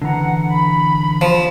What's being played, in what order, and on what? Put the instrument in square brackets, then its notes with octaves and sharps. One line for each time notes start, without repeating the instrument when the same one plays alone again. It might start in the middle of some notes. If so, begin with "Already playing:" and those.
[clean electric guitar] D3 E3 A#5 [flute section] F#5
[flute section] B5
[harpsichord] F3